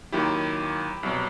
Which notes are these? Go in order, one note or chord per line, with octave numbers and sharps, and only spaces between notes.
D#2 D#3 F#3 E4 G4
C2 B2 F#3